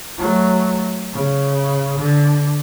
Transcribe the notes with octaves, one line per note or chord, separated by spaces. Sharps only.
F#3 A3
C#3
D3